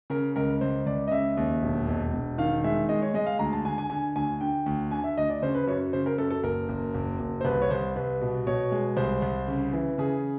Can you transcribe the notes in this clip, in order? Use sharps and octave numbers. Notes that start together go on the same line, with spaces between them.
C#3 A#4
C#2 A#4
C#2 C5
C#2 D5
D#5
C#3 E5
D#2
E1
E1
E1
D#3 F5
G#3 E5
G#3 D#5
C#5
G#3 D#5
F5
D2 A#5
A5
D3 G#5
G#5
D3 G#5
D2 G#5
D3 G5
D2
D3 G#5
E5
D2 D#5
D5
C#3 C5
B4
F#2 C#5
C#3 C5
A#4
F#2 A4
A4
F#1 A#4
F#1
F#1
F#1
C5
C2 B4
C#5
C2 C5
C2 B4
B2
B2 C#5
G#3
C2 C5
C2
C#3
E3
C#3 G#4